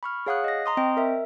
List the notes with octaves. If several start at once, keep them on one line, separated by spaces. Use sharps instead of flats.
B5 C#6 F6
G#4 C#5 F5 F#5 D#6 F#6
D#5 A#6
A#5 C6 D#6
C4 D#5 G5
A#4 E5